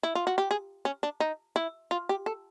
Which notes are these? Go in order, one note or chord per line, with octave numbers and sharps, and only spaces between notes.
E4
F4
F#4
G4
G#4
C#4
D4
D#4
E4
F4
G4
A4